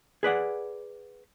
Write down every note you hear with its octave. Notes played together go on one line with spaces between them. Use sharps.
G#4 B4 D5 F#5